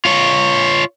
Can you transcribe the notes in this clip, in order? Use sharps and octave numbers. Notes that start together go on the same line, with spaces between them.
F4 C#5